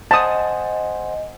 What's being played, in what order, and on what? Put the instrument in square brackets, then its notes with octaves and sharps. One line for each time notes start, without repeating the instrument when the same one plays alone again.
[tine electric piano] C5 F#5 G#5 [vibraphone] D#5 [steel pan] A5 D#6